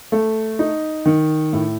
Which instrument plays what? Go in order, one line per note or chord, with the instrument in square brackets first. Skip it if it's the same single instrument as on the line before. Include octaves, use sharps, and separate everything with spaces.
[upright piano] A3
D#4
D#3
A2